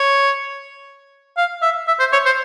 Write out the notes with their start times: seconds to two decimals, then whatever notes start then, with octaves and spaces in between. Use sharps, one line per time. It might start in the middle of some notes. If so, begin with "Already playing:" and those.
Already playing: C#5
1.37 F5
1.62 E5
1.88 E5
2.00 C5
2.13 C#5
2.26 C5